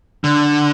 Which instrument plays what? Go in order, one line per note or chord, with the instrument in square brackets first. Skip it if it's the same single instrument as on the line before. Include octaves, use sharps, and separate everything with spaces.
[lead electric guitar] D3